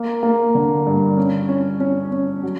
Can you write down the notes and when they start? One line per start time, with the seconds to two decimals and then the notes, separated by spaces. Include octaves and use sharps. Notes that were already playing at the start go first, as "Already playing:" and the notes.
Already playing: A#3
0.23 A#3
0.55 D3
0.87 G2
1.17 C#4
1.49 C#4
1.80 C#4
2.12 C#4
2.43 F#3